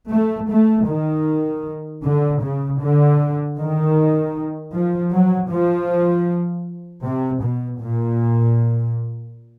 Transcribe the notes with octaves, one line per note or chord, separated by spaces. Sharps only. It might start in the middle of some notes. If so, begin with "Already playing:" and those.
A3
A3
D#3
D3
C#3
D3
D#3
F3
F#3
F3
C3
B2
A#2